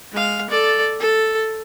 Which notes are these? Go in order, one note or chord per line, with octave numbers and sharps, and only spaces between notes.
G#3 F5
A4 D5
A4